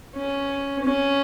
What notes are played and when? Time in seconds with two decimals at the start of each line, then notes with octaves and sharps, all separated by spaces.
0.16 C#4
0.84 C#4